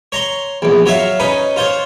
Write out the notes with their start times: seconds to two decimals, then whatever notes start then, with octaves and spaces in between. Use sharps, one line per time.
0.12 C#5 A#5 C6
0.62 A#1 E2
0.86 F#3 C#5 E5 F5
1.20 C#4 D#4 B4
1.56 F4 C5 C#5